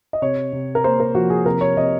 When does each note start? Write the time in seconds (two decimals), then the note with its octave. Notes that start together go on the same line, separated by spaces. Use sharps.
0.13 D#5
0.22 C3 C#5
0.53 C3
0.75 A#4
0.84 A#3 C5
1.00 A#4
1.15 F3 F#4
1.30 G#4
1.46 C3 A#4
1.61 C#5
1.77 C3 D#5